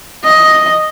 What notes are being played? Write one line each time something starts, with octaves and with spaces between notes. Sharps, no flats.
D#5